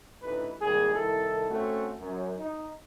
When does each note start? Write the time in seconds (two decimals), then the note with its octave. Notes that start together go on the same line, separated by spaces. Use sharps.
0.23 A1 D2 E3 D#4 B4
0.62 G#1 D#2 G3 G#4
0.95 C2 D#3 E4 A4
1.50 A3 C4 C#4 F#4 A4
2.00 F#2
2.38 D#4